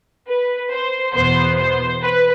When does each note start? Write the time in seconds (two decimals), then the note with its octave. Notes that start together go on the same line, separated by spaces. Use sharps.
0.28 B4
0.72 C5
1.15 E2 B2 B3 C5
1.58 C5
2.01 B4